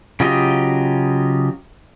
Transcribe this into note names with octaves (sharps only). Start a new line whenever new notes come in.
C#3 F#3 F4 G4 D#5